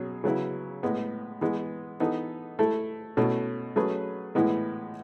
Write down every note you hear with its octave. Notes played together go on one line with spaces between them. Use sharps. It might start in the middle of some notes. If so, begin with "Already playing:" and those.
Already playing: B2 F#3 C#4 G#4
C#3 F#3 B3 E4
A2 G#3 B3
E3 G#3 B3
E3 B3 D#4 A4
A3 E4 A4
B2 A3 C#4 E4
F#3 A3 C#4 G#4 B4
A2 E3 G#3 B3 E4